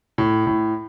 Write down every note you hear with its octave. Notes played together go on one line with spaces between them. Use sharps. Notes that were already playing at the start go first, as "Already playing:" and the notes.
A2
A2